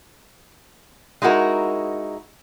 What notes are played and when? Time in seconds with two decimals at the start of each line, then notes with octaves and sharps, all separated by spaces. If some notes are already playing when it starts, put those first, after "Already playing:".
1.22 G#3 D#4 E4 F#4 A#4